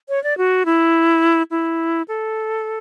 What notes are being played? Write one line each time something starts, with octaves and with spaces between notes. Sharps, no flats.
C#5
D5
F#4
E4
E4
A4